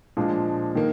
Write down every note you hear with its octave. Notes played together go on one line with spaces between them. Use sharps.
A#2 F3 G#3 D4
D#3 A#3